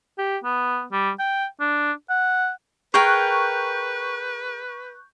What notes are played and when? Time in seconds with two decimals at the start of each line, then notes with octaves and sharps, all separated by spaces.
0.18 G4
0.44 B3
0.92 G3
1.19 G5
1.60 D4
2.10 F#5
2.94 G#4 A#4 B4 G5 C#6 F#6 G6